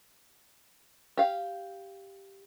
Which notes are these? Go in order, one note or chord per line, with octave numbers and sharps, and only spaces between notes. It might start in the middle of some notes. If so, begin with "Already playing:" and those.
G4 F5